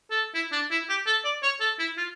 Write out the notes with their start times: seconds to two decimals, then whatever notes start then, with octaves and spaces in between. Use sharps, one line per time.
0.11 A4
0.35 E4
0.52 D4
0.71 E4
0.89 G4
1.07 A4
1.24 D5
1.43 C#5
1.60 A4
1.79 E4
1.97 F4